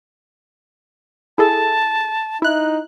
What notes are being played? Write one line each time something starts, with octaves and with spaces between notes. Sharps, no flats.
E4 G#4 A4 A5
D#4 E4 F#6